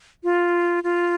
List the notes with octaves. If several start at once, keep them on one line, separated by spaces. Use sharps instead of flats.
F4
F4